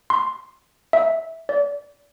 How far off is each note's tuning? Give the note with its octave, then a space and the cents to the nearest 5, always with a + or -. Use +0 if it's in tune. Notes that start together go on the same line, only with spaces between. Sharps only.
C6 +5
E5 -15
D5 -35